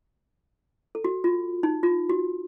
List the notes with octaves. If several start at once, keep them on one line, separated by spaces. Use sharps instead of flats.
A4
F#4
F4
D#4
F4
F#4